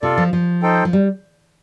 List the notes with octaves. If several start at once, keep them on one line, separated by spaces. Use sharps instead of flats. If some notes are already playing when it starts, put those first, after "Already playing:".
C3 F4 A4 D5
F3
F3
D#4 A4 C5 G5
F3
G3